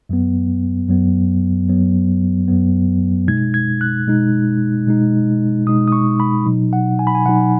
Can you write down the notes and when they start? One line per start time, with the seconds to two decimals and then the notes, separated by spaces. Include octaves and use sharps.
0.09 F#2 F#3 B3
0.89 F#2 F#3 B3
1.69 F#2 F#3 B3
2.48 F#2 F#3 B3
3.28 B2 G#3 D#4 G#6
3.54 G#6
3.81 F#6
4.07 B2 G#3 D#4
4.86 B2 G#3 D#4
5.66 B2 G#3 D#4 D#6
5.88 D#6
5.92 C#6
6.20 B5
6.46 B2 F#3 D#4
6.73 F#5
6.99 G#5
7.07 B5
7.15 G#5
7.25 B2 F#3 D#4 F#5